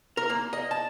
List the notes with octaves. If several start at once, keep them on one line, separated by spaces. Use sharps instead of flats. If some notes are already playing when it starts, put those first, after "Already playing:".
A#4
A#3
D#5
A5